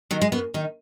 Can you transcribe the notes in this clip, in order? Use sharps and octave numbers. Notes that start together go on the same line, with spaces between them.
D#3 F#3
G#3
F#2 B3
D#3 D#4